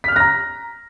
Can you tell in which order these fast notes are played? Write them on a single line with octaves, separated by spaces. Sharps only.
B6 F6 F#6 A#6 A#5